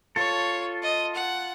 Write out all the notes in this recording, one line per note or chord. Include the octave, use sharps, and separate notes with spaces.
F4 A4 C#5
D#5
F#5